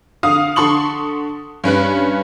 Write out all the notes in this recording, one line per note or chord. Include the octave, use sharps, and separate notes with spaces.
D3 F5 D#6
D3 A4 C6 C#6 F#7
G2 C#4 B4 F#6